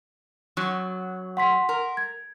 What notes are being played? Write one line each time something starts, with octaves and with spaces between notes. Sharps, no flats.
F#2 F#3
F#5 C6 B6
A#4
G#6